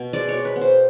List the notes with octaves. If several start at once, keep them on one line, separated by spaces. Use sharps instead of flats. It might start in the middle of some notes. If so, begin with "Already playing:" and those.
Already playing: B2
G#3 D5
C#5
B2
B4
B3
C5